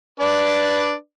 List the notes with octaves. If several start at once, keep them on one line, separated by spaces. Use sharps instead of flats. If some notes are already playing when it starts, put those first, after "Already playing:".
D4 B4 D5